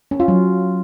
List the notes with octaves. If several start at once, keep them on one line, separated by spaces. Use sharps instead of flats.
C#4
F4
F#3